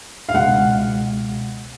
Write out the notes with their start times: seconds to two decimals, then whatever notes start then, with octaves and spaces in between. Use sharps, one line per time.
0.29 F5
0.34 C#2 B2 G#3 F#5